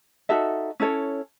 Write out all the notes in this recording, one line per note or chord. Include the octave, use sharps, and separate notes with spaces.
D#4 F#4 A4 E5
C#4 E4 A4 C#5